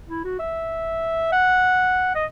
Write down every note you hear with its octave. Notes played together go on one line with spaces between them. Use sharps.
E4
F#4
E5
F#5
D#5